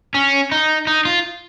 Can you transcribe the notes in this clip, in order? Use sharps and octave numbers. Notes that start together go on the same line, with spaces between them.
C#4
D#4
D#4
F4